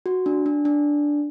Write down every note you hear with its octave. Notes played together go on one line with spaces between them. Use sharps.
F#4
D4
D4
D4